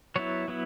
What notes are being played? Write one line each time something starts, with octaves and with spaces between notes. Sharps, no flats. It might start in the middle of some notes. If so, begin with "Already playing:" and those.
F#3 B3 E4 C#5
F#3 B3 E4